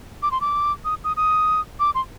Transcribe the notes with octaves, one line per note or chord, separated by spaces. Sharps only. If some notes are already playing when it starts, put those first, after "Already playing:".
D6
C6
D6
D#6
D#6
D#6
D6
C6